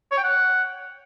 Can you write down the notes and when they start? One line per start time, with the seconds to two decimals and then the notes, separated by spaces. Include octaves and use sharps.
0.12 C#5
0.18 G5
0.23 F#5